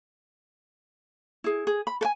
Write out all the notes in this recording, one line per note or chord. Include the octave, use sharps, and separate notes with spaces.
E4 G#4
G#4
B5
A4 G#5